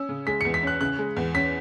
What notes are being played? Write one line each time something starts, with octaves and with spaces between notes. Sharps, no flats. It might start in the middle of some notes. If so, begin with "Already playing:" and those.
Already playing: C#4 E6
C#3
G#3 B6
E2 C#7
B6
C#4 F#6
C#3 F#6
G#3
E2
C#4 B6